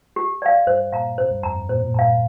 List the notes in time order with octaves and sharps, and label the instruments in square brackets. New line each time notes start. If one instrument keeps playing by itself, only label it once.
[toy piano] G4
D5 F5
[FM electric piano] G2 [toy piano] C5
[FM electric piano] A#2 [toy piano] F5 A#5
[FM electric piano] C3 [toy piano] C5
[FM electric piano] G2
[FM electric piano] F2 [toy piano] A#5
[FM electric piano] G2
[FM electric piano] A#2 [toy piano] C5
[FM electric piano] A#2
[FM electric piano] G2 [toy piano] A#5
[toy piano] F5